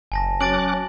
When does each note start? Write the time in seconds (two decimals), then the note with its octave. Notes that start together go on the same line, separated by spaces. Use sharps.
0.12 F#1 G#5 A5 A#6
0.41 F#3 C#4 D6 F#6 A6 D7 F#7